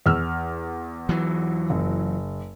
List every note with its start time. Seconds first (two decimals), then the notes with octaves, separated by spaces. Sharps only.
0.06 E2 E6 F6
1.09 E3 F#3
1.70 F#1